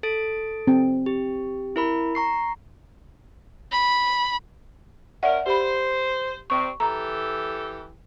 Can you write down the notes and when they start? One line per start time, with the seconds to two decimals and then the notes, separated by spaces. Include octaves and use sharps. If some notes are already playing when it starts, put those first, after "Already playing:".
0.03 A4 A6 D7
0.67 C4
1.06 G4
1.76 E4 A#4 B5
2.15 A#5 C#6 C7
3.72 B5
5.23 C#4 A#4 D5 E5 F#5
5.46 G4 C5 B5
6.50 C3 G3 C4 C#6
6.80 E3 G4 A4 A#5